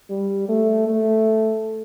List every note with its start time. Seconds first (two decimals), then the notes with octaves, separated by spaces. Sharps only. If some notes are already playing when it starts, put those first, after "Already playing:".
0.10 G3
0.48 A3
0.87 A3